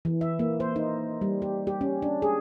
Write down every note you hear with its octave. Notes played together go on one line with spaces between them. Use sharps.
E3
E5
A#3
C5
D#4
G3
G4
G4
C#4
D4
G#4